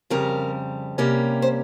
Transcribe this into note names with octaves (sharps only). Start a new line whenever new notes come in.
F2 C#3 G3 A#4
C3 G3 A#3 C#4
C5